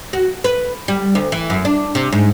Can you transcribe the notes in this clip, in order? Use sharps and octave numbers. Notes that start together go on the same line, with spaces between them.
F#4
B4
G3
D2
E3
F#2
D4
C3
G#2